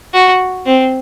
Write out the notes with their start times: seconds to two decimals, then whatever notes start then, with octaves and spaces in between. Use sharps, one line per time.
0.14 F#4
0.66 C4